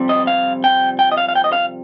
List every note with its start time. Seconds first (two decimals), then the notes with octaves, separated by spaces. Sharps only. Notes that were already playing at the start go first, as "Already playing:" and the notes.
Already playing: F2 C3 G3
0.09 D#5
0.27 F5
0.64 G5
0.99 G5
1.12 D#5
1.17 F5
1.29 F5
1.35 G5
1.44 D#5
1.53 F5